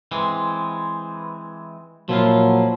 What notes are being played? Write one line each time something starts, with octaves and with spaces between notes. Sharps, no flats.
E3 G#3 C4
A#2 F3 F#3 E4 F4